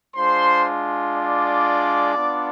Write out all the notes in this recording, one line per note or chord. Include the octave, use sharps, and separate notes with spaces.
G#3 D4 F4 C5 C6
D5 D6
B3 D4 F4